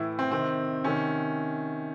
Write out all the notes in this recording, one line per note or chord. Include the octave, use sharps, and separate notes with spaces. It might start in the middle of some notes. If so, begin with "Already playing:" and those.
Already playing: A2 E3 E4
C4
C3 D#3 C4
C3 D#3 C#4